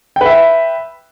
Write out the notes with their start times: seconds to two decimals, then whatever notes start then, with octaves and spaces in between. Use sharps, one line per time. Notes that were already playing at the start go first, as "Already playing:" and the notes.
0.16 G5
0.21 B4
0.26 E5